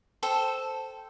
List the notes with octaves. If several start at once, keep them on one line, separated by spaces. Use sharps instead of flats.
A4 C5 G5